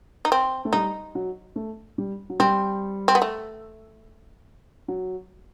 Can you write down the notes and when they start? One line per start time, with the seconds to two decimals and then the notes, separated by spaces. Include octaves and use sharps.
0.25 D#4
0.32 C4
0.65 A3
0.73 G3 D#4
1.15 F#3
1.56 A3
1.98 G3
2.30 F#3
2.40 G3 C4
3.08 C4
3.15 B3
3.22 A3
4.88 F#3